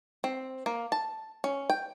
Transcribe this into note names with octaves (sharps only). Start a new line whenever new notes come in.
C4
A#3
A5
C#4
G5